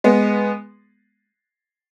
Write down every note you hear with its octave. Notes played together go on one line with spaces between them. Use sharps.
G#3 B3